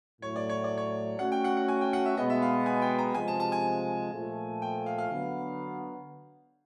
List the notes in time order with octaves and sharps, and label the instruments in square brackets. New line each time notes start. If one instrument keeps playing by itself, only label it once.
[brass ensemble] A2 F#3 A3 [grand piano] C#5
[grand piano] D5
C#5
D5
C#5
[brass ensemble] A3 C#4 F#4 [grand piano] F#5
[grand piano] G5
F#5
F#5
G#5
G5
F#5
E5
[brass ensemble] B2 G#3 B3 [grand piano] D#5
[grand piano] E5
F5
G#5
G5
A#5
[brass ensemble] C3 F3 G#3 [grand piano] G#5
[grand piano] A5
A5
G#5
[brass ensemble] A#2 F3 A3
[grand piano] G5
F5
F5
[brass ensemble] D3 F#3 B3